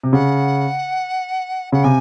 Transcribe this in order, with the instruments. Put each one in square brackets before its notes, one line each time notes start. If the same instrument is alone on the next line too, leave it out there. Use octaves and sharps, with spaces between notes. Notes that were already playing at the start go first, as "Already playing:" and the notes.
[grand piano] C3
[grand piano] C#3 [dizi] F#5
[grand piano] C#3 [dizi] F#5
[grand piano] C3 [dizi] G#5